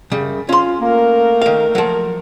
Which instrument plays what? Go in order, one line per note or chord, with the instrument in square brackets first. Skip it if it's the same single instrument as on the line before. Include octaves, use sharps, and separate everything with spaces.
[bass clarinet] F#2 [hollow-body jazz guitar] C#3 G3
[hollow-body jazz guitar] C#4 C6 [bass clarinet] F4
[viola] A3 A#4 [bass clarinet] A#3
[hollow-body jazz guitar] D#3 F5
F3 F#3